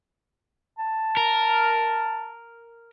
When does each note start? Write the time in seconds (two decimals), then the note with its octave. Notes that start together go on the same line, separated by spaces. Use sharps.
0.79 A5
1.17 A#4